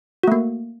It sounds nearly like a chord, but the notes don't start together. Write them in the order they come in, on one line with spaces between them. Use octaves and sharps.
F#4 A3 A#3